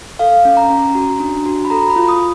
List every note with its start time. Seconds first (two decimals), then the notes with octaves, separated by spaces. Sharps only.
0.19 A4 F5
0.45 C#4
0.57 A#5
0.70 C#4
0.95 F#4
1.20 D4
1.46 F#4
1.65 B5
1.70 A4 A#5
1.90 B5
1.96 F4
2.08 D#6